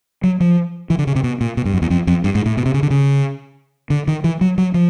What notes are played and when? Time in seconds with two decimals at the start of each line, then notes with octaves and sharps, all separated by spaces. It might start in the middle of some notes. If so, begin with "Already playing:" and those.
0.24 F#3
0.40 F3
0.90 E3
0.99 D3
1.07 C#3
1.16 C3
1.24 B2
1.41 A#2
1.57 B2
1.65 G2
1.74 F#2
1.82 E2
1.90 F2
2.07 F2
2.24 G2
2.35 G#2
2.46 A2
2.57 B2
2.66 C3
2.74 C#3
2.83 D3
2.90 C#3
3.90 D3
4.08 D#3
4.24 E3
4.41 F#3
4.58 F#3
4.74 F3